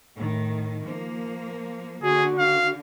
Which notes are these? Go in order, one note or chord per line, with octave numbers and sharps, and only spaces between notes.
A2 D#3
F3 A#3
D3 F#4 G#4
F5